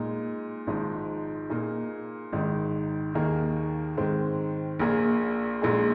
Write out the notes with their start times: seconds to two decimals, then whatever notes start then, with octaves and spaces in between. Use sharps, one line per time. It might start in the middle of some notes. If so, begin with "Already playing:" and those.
Already playing: A#2 G#3 D#4
0.67 G#1 G#2 F3 G#3 D#4
1.50 A#2 A#3 D#4 G#4
2.32 G#1 G#2 D#3 G#3 D#4
3.14 D#2 D#3 A#3 D#4 G#4
3.97 G#2 D#3 G#3 C4
4.80 A#1 A#2 A#3 G#4
5.62 A#1 A#2 G#3 D#4 G#4